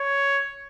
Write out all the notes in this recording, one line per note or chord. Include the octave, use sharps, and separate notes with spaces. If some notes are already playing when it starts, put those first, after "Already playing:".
Already playing: C#5